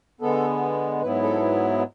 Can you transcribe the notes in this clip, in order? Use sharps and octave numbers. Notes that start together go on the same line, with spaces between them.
D3 G#3 B3 A4
G#2 F#3 B3 E4 B4
A4